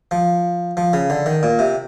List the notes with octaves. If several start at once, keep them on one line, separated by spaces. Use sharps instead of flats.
F3
F3
C#3
D3
D#3
A#2
C3